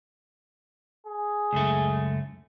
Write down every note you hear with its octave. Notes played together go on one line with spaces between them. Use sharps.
G#4
C#2 F#2 A3